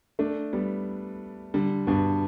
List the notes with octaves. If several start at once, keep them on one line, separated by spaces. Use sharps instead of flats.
A3 D4
G3 B3
D3 G3
G2 B2